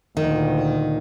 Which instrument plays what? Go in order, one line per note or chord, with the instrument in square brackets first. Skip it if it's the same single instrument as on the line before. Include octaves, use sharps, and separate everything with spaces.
[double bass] D2 A#2 [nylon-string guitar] D#3